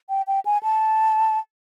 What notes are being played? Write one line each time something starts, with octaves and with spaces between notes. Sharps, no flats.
G5
G5
G#5
A5